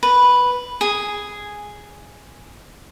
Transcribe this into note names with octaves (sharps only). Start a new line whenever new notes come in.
B4
G#4